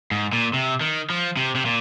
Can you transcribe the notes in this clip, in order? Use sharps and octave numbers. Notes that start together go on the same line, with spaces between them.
G#2
A#2
C3
D#3
F3
C3
C3
A#2